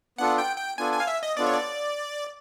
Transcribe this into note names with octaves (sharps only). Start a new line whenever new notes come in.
B3 D4 F4 A4 F#5
G5
G5
B3 D4 F4 A4 G#5
G#5
F5
E5
D#5
B3 D4 F4 A4 D5
C#5
D5